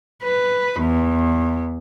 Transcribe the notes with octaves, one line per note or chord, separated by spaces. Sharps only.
B4
E2